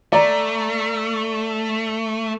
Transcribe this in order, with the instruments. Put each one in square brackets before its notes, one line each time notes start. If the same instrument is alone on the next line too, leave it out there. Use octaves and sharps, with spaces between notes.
[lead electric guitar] A3 [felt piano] D5 A#5